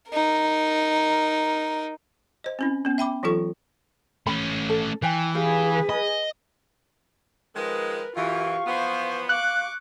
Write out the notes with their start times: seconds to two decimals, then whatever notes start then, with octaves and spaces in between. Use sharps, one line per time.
0.10 D#4 A#4
2.44 C5 D#5
2.59 C4 C#4 E4
2.85 B3 C#4
2.98 E5 G5 B5 D6
3.23 E3 F#3 D#4 F4 A4 C#6
4.27 A3 C#4 B5
4.69 A4
5.02 E3 B4 G5 G#5
5.35 G4 G#4 B4 F5
5.89 D#5 B5
7.55 D#3 F3 G#3 A#4 B4
8.16 F#2 E3 F4 G4 F5 C#6
8.66 E3 F3 B3 C5
9.29 F5 C#6 D6 F#6